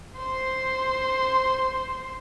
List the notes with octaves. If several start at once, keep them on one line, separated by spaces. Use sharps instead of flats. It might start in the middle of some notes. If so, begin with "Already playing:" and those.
C5 C6